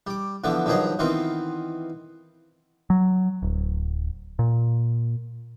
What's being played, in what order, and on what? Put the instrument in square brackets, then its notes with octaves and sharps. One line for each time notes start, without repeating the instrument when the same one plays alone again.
[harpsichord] G3 D6
D3 E3 F3 B3
G2 D#3 F3 F#3 G#4 D#5
D#3 E3 B3 C4 F4
[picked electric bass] F#3
D1
A#2